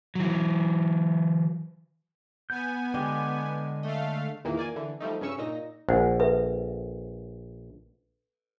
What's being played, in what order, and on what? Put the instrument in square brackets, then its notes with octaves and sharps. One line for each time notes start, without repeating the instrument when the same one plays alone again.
[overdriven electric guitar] E3 F#3
[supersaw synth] B3 G#5 [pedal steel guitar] G6
[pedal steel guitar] D3 G#3 [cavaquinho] G4
[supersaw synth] A3 F5 [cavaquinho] D#5
[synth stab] E2 A#2 D#3 E3 A#3
A#3 D5 G#5
D3 E3
F3 G3 A3 D#4
G2 C#3 C#4 C#6 E6
A#2 D#4 A#6
[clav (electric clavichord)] A#1 [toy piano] C5 F#5 G#5
[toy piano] A4 B4 E5